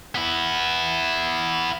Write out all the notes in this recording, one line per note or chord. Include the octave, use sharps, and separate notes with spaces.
B3 E4